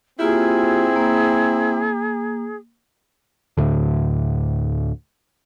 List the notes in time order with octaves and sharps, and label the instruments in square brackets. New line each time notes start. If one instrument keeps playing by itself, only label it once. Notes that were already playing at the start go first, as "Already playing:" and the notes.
[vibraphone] A#3 F4 G4 [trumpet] C4 [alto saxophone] E4 [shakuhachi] G#4
[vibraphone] A#3
[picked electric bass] D2 A2 D3